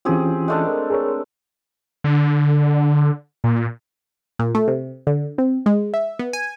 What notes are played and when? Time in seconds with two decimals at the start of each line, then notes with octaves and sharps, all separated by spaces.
0.05 E3 C4 C#4 F4 G4 G#4
0.48 G#3 A3 D4
0.67 A#4
0.90 G#4 A#4 C#5
2.04 D3
3.44 A#2
4.39 A#2
4.55 A3
4.68 C3
5.07 D3
5.38 C4
5.66 G#3
5.94 E5
6.19 B3
6.33 G#5